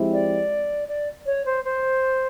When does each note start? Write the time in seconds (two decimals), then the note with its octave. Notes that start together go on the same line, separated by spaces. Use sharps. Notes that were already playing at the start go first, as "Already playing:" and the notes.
Already playing: F3 G#3 C4 E4 G4
0.13 D5
0.88 D5
1.26 C#5
1.46 C5
1.65 C5